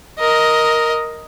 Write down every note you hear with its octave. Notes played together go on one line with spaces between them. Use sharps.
A#4 D#5